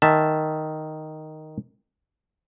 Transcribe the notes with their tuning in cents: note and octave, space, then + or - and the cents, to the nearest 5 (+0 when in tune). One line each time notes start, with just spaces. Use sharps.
D#3 +0 E5 +0 A5 +0